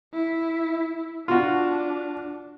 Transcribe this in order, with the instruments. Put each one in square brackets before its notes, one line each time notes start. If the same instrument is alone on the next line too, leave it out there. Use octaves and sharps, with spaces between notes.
[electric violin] E4
[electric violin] D4 [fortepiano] F4 F#4